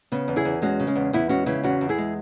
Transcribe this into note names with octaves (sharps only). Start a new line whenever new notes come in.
C#3 B3
E2
E4 G#4
E2
G#3 C#4 F#4
C#3
G#3 C#4
E2
E2 B3 E4
G#3 C#4 F#4
C#3 B3 E4
E2 C#4 F#4
E2
E4 G#4
G#3